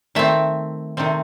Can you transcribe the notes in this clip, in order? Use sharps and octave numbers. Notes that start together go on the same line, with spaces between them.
D#3 A3 C4 E5
C3 D#3 A3 C4